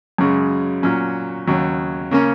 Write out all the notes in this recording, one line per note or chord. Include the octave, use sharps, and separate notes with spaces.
F#2 C#3 G#3
A#2 F#3 C#4
D#2 C#3 F#3
C#3 A#3 C#4